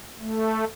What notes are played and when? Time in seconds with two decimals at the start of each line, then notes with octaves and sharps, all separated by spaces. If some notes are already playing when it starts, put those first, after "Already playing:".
0.19 A3